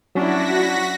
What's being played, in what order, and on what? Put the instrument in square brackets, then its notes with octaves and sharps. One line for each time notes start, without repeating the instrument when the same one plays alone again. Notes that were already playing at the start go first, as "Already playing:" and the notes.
[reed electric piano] F#3 C#4 [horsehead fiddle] D4 E4 [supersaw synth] F#4 A#6 B6